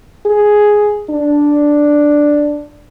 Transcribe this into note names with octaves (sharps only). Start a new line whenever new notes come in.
G#4
D4